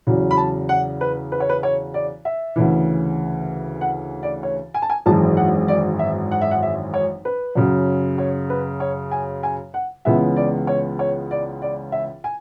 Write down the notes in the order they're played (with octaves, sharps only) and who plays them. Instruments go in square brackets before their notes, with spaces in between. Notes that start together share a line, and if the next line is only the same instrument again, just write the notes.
[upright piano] E2 C#3 F#3
B5
A5
F#5
B4
B4
C#5
B4
C#5
D5
E5
D2 C#3 E3
F#5
D5
C#5
G#5
A5
G#5
G#1 F#2 E3 G#3 A5
F#5
D5
E5
F#5
E5
F#5
E5
C#5
B4
F#2 C#3 F#3
C#5
B4
C#5
G#5
G#5
F#5
C#2 C#3 E3 G#3 B3 E5
D5
C#5
C#5
D5
D5
E5
G#5